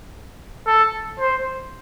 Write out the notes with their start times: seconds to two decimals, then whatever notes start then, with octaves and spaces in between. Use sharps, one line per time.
0.67 A4
1.20 C5